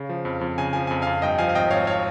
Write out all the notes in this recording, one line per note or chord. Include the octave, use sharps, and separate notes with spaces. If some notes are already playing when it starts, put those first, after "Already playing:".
Already playing: C#3
F3
F2
F2
C#3 G#5
F3 G#5
G#5
F2
F2 F5 G#5
G2 D#5 G5
F3 F5 G#5
F5
G#1 D#5 G5
G#1 C#5 F5
C#5 F5